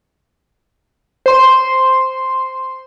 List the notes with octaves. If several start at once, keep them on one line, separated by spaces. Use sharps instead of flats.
C5 C6